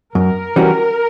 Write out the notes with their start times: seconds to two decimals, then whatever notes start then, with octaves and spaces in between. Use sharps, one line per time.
0.15 F#2 A#4
0.56 E3 G3 C#4 F#4